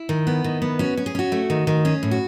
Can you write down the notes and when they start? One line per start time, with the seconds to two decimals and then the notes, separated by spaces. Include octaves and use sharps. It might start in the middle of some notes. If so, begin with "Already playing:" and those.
Already playing: E4
0.09 D#3
0.27 B3
0.44 D#3
0.62 B3
0.79 C#4 F#4
0.97 C#4
1.06 G#4
1.15 C#4 F#4
1.32 A3
1.50 D#3
1.67 D#3
1.85 C#4 G#4
2.03 A2
2.11 F#4